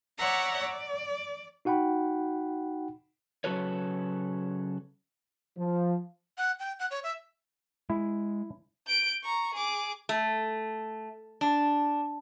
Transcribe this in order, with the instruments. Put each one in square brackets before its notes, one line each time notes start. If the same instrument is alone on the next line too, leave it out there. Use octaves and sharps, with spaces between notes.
[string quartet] C#5 D5 E5 F#5 A#5
D5
[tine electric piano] D#4 F#4 F#5 G5 B5
[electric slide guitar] C#3 F#3 F#4 A4 B4 C#5
[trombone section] F3
[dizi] F#5
G5
F#5
C#5
E5
[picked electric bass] G#3 [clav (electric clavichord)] E4
[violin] G6 D7
A#5 C#6
G#4 D6
[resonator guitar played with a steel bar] A3
D4